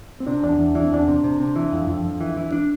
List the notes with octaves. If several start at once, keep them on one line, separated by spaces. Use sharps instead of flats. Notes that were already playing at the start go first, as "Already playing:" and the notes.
C4
C3 D4
E2 D4
E2
E3 D4
C4
E2 D4
C3
C3
C3
E3
F2
F2
F2
E3
E3
D4